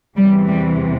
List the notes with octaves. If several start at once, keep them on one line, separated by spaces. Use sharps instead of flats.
E2 C3 E3 G3
G3